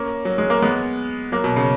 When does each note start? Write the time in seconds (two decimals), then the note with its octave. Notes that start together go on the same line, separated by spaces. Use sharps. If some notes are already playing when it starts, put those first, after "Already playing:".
Already playing: A#3 C#4
0.25 F#3
0.38 G#3
0.50 A#3
0.62 G#3 B3
1.32 F#3 A#3
1.44 B2
1.56 C#3